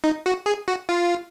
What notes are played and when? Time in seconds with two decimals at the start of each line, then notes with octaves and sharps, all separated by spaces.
0.04 D#4
0.26 F#4
0.46 G#4
0.68 F#4
0.89 F4